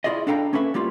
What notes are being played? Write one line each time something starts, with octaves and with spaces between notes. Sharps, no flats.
E4 F4 G#4 D5 D#5
D4 A4 F5 G5 A#5
A#3 C#4 A4 B4 E5
G3 A#3 E4 F4